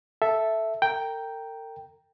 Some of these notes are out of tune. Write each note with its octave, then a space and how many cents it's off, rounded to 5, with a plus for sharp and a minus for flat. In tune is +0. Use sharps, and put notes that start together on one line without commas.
A4 +0 E5 +0
A#4 -45 G5 +0 A#5 +0